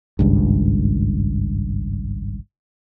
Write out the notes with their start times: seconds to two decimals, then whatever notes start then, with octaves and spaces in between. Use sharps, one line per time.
0.19 G#1 C#2 G2